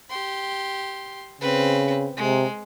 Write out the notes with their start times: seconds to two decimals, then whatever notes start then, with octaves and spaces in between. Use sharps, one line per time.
0.10 G4 C6
1.41 C#3 C4 B4
2.17 C3 G#3